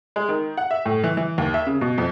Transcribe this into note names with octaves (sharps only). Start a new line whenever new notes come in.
G#3
D#3
F#5
E5
A2
E3
E3
D#2
E5
C#3
B2
F2